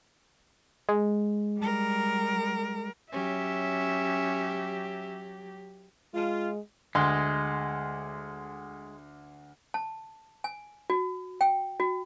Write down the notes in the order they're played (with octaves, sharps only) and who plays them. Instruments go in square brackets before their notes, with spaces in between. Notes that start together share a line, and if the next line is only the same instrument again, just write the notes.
[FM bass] G#3
[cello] G3 A#4
[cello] F#3 G4 [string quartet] C#4 [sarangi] E5
[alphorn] G#3 [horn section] F4
[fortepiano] D2 C6 [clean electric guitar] G#3
[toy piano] A5
G#5
F#4
G5
F#4